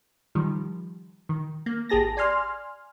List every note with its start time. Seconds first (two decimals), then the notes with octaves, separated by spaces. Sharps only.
0.35 D#3 F3 G3
1.29 D#3
1.66 A#3
1.89 G#1 G4 G#4 A5 A#6
2.17 D5 G#5 C6 F6